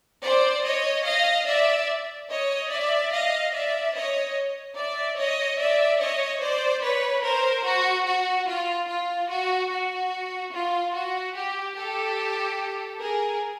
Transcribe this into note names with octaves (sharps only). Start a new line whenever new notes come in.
C5 D5
C#5 D#5
D#5 F5
D5 E5
C#5 D#5
D5 E5
D#5 F5
D5 E5
C#5 D#5
D5 E5
C#5 D#5
D5 E5
C#5 D#5
C5 D5
B4 C#5
A#4 C5
F#4
F#4
F4
F4
F#4
F#4
F4
F#4
G4
G4 A4
G#4 A#4